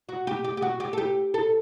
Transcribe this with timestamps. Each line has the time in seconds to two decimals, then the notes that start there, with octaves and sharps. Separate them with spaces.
0.09 F#4
0.27 G4
0.44 G4
0.57 G4
0.62 F#4
0.80 G4
0.93 A4
0.98 G4
1.34 A4